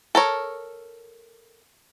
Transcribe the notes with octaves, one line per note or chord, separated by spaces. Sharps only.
A4 A#4 C#5